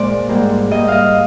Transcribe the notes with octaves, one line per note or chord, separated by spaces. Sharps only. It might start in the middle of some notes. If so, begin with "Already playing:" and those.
Already playing: A#2 G#3 C5 D5
G#2 G3 A#3
G#2 G3 A#3 D#5
D#5 F5